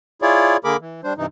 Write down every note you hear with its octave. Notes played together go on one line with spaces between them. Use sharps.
E4 F4 G#4 C#5 D5
D3 A#3 G#4 A#4 B5 D6
E3
G3 D4 C5
G2 C3 E3 D#4